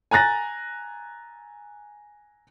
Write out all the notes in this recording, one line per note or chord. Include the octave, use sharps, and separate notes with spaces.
G#5 A#5 F#6 A6 A#6